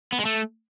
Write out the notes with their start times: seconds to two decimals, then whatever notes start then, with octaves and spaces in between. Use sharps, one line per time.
0.12 B3
0.19 G#3
0.25 A3